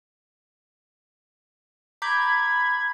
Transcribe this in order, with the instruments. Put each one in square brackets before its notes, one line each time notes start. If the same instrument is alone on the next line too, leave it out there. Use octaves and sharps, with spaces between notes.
[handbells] A#5 D6 G6 [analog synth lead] B5 [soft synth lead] G#6